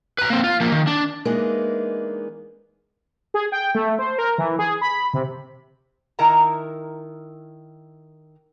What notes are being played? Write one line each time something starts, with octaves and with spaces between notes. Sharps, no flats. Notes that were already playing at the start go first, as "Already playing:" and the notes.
B4 A#5
A#3 C4
F4
F3 A#3
D#3
D4
E3 G#3 A#3 B3 D4 D#4
G#4
G5
A3
C5
A#4
E3
G#4
B5
C3
D#3 E4 A#4 A5 A#5